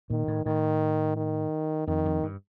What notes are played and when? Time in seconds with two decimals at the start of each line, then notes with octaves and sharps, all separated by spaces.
0.10 A#2 D#3
0.28 A2
0.45 A2 D#3
1.16 D#3
1.87 F2 D#3
2.05 F2
2.23 G2